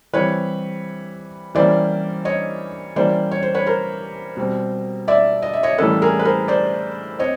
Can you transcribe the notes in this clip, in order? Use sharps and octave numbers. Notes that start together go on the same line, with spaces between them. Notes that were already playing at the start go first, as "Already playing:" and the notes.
E3 G3 C4 B4 C#5
E3 G3 A#3 C#4 C5 D5
C#5 D#5
E3 G3 A#3 C#4 C5 D5
C#5
C5
B4 C#5
A#4 C5
B2 G3 C4
D5 E5
D#5
E5
C#5 D#5
A2 E3 G3 A#3 C#4 A4 B4
G#4 A#4
B4
A#4 C5
C5 D5
C4 C#5 D#5